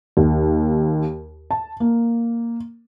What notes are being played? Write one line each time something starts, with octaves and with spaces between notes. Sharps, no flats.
D#2
A5
A#3